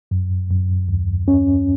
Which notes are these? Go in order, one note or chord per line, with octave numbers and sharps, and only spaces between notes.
F#2
F#2
D#2
C#4